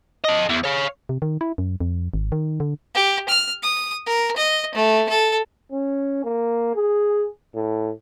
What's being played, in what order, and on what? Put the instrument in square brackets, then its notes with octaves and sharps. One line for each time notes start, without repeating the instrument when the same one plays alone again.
[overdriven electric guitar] A4 D#5
E2
C#5 F5
[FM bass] C3
D#3
E4
F#2
F2
G#1
D#3
D3
[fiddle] G4
F6
D#6
A#4
D#5
A3
A4
[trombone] C#4
A#3
G#4
A2